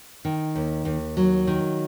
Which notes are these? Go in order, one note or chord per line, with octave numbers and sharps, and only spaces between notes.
D#3
D#2
D#2
F#3
D#3